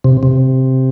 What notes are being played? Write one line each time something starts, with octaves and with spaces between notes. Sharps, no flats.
C3
C3